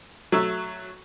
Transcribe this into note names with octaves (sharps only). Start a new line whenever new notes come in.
F#3 A3 E5